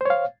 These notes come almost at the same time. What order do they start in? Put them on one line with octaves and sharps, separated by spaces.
C5 C#5 F5